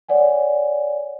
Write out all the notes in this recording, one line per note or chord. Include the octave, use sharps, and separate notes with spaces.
C#5 D5 F#5 G#5